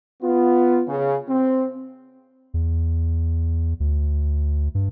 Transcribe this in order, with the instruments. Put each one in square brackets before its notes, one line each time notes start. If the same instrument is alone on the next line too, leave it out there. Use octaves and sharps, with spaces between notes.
[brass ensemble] B3 F4
C#3
C4
[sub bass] E2
D2
G2